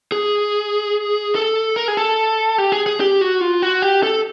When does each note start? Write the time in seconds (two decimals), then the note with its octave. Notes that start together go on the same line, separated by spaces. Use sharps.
0.12 G#4
1.35 A4
1.76 A#4
1.88 G#4
1.97 A4
2.58 G4
2.72 G#4
2.86 G#4
3.01 G4
3.21 F#4
3.41 F4
3.62 F#4
3.82 G4
4.03 A4